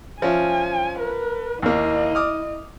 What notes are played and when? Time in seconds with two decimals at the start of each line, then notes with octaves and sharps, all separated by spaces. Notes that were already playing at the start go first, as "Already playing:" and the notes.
0.22 F3 C#4 E5 G#5
0.99 A#4 B4
1.62 D#2 A#3 E4 D#5
2.15 D6 D#6 F6